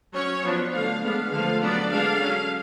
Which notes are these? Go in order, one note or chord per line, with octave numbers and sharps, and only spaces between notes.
F#3 C#4 C#5
F3 B3 D4
D3 F#3 A3 D4 F5
G#3 B3 D4 F5
D3 F3 A3 F5
F#3 B3 D4 D5
D3 G#3 D4 F5
F#3 C#4